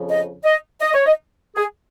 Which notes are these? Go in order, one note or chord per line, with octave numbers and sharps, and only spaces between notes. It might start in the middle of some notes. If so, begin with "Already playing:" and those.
Already playing: F2 C#3 F3
D#5
D#5
D#5
C#5
D#5
G#4